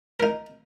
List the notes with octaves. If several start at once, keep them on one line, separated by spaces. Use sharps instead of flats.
D#4 A#4